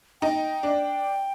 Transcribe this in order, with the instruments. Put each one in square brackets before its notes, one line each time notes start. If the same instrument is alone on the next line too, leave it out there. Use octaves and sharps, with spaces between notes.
[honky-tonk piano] D#4 [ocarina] G5
[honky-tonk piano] D4